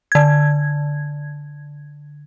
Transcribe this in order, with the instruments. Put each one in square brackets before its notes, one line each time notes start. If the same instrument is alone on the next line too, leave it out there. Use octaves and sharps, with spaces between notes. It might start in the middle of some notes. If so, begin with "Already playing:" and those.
[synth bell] D3 G#6